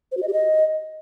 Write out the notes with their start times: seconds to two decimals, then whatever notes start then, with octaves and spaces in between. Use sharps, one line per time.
0.12 C5
0.17 F#4
0.22 D#5
0.28 G4
0.33 D#5